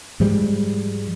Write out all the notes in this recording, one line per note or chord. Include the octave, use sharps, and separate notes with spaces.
G#2 F3 G3 G#3